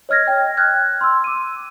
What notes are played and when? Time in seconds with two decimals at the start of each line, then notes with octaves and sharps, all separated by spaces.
0.09 C#5 D#5 F6 G#6 A#6
0.27 G5
0.57 F6 F#6 G#6
1.01 C6 E6
1.24 D6 D#7